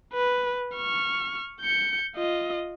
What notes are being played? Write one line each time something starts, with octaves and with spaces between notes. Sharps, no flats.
B4
C#6 F6
G6 C#7
F4 D#5